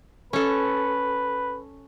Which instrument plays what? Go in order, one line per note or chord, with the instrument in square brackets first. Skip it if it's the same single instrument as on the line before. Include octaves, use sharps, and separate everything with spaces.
[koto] C#4 A4 [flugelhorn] B4